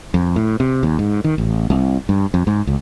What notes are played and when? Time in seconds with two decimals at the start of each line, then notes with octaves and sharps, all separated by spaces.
0.14 F2
0.36 A2
0.60 C3
0.83 D#2
0.99 G#2
1.24 D#3
1.38 A1
1.70 C2
2.09 G2
2.34 F2
2.47 G#2
2.67 C#2